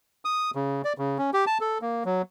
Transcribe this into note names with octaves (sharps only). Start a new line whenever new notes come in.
D#6
C#3
D5
C#3
C#4
G4
A5
A4
A#3
F#3